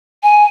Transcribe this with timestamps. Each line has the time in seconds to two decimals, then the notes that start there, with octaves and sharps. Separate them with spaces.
0.23 G#5